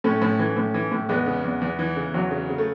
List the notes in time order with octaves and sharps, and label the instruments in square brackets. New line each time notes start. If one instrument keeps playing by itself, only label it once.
[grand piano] A2 A3 C#4
A2
E3
A2
E3
A2
E2 G#3 B3
C#3
E2
E2
E3
C#3
E2 F#3
C#3
C#3
A3